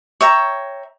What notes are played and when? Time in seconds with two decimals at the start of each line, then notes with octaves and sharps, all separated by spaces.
0.21 C#5 E5 G5 A#5